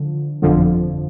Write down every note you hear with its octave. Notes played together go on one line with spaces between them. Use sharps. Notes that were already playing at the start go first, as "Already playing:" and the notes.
Already playing: D3 F3
G1 F2 D3 F3